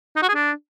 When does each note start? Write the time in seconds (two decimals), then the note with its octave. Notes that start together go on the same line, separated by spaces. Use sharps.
0.16 D#4
0.22 F#4
0.29 G#4
0.35 D4